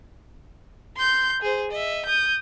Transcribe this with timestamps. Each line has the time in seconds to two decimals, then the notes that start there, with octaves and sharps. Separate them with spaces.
0.97 C6 G6
1.42 G#4 C5
1.71 D#5 E5
2.05 D#6 G6